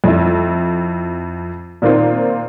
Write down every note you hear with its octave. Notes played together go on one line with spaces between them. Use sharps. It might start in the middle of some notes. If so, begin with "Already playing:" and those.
F2 E4
A#2 D#3 A#3 C4 F4